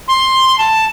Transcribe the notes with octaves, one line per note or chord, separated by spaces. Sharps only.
C6
A5